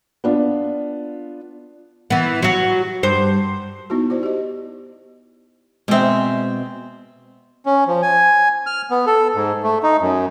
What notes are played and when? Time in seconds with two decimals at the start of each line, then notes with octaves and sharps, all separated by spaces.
0.24 B3 D4 F4
2.10 E3 B3
2.42 F#3 F#4
3.03 G2 C5
3.90 B3 D#4 E4 F#4
4.10 E4 C5 D5
4.23 G4 D#5
5.88 B2 G#3 C4 E5
7.66 C#4
7.87 F3
8.02 G#5
8.66 F6
8.91 B3
9.07 A4
9.35 G#2
9.63 A3
9.83 D#4
10.01 F#2